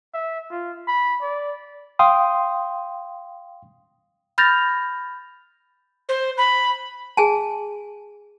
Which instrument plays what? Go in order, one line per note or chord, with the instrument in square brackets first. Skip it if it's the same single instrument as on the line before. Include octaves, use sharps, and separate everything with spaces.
[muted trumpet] E5
F4
B5
D5
[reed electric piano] F5 G5 C6 D#6
[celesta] B5 F6 G6 A6 A#6 F7
[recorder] C5
B5
[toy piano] G#4 G#5 A5